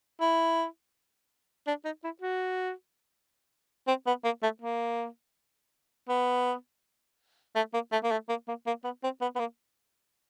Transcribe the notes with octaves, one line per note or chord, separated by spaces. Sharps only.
E4
D4
D#4
E4
F#4
C4
B3
A#3
A3
A#3
B3
A3
A#3
A3
A#3
A3
A#3
A#3
A#3
B3
C4
B3
B3
A#3